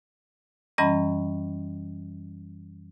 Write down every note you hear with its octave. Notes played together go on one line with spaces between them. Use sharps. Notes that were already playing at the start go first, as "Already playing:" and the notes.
F#2 E3 G3 C#4 D#5 B5